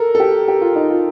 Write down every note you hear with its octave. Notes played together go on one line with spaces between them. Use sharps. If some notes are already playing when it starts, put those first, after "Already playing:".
Already playing: A4 A#4
A4
G4
G4
F4
D#4
F4